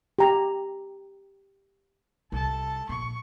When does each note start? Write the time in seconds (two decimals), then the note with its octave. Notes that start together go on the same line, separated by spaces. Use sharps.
0.19 G4 A#5
2.32 C2 A4 A5
2.89 A#1 C#6